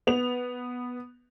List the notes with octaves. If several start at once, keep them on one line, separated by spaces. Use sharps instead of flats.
B3 F7